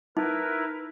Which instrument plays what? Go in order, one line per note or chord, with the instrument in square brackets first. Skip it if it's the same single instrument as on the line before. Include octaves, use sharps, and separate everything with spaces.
[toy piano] D#4 [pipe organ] E4 A#4 B4